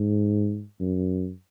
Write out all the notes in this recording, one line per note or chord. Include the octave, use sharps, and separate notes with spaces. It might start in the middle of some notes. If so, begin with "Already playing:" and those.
Already playing: G#2
F#2